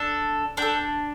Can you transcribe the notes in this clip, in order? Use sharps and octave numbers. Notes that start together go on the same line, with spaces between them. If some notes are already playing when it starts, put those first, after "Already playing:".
Already playing: D4 A4
D4 A4 G5